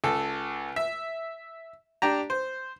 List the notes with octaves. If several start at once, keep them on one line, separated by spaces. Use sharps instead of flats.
C#2 A4
E5
D4 G4 A#5
C5